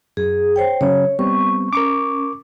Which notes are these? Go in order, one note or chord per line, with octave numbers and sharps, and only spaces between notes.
F#2 G#4
C5 C#5 G5
C#3 F#3 C#4 C#5
G3 B3 C4 C#6
C#4 A#4 C#6 D6